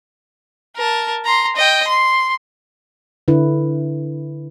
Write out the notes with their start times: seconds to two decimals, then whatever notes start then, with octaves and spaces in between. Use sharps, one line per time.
0.76 A#4 A5
1.25 A#5 C6
1.56 D#5 G5
1.87 C6
3.28 D3 E4 B4